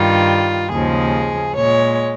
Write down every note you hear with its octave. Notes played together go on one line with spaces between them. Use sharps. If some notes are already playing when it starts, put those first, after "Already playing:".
Already playing: G2 D#3 G3 F4
D#2 C#3 F3 G#3 G#4
A#2 G#3 C#5